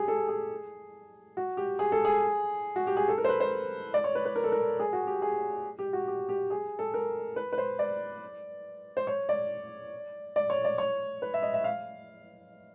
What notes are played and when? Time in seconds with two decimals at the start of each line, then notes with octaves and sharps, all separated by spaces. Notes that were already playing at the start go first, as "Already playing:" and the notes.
Already playing: G4 G#4
0.08 A4
0.29 G#4
1.37 F#4
1.57 G4
1.79 G#4
1.92 A4
2.05 G#4
2.76 F#4
2.87 G4
2.97 G#4
3.08 A4
3.18 A#4
3.24 C5
3.29 B4
3.40 C5
3.94 D5
4.04 C#5
4.15 B4
4.25 B4
4.36 A#4
4.44 A4
4.52 A#4
4.79 G#4
4.93 F#4
5.07 G4
5.22 G#4
5.79 G4
5.93 F#4
6.08 G4
6.29 G4
6.50 G#4
6.79 A4
6.94 A#4
7.36 B4
7.53 B4
7.58 C5
7.79 D5
8.97 C5
9.07 C#5
9.29 D5
10.36 D5
10.50 C#5
10.65 D5
10.78 C#5
11.22 B4
11.34 E5
11.43 D#5
11.54 E5
11.64 F5